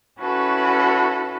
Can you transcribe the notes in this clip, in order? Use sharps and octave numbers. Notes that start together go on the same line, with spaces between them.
C#4 E4 F#4 A4 B4